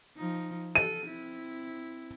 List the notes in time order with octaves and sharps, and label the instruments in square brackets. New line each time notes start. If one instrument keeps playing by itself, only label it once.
[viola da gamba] F3 D#4
[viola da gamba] A4 [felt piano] D#7
[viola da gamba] C4 E4